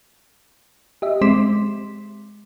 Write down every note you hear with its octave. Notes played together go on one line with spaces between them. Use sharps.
G4 D#5 E5
G#3 C4 C6 D6 B6 E7